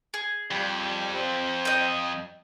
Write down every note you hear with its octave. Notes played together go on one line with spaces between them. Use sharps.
G#4
F2 G3
C4
D#5 G5